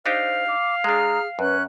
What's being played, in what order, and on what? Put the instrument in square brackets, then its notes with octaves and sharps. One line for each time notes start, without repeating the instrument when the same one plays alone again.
[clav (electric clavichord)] D4 D#4 G4 [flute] C5 [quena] F5
[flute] D6
[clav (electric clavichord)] G#3 D4 [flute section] G#4 F6 [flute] A#5
[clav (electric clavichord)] F#2 [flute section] C#4 F#6 [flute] B4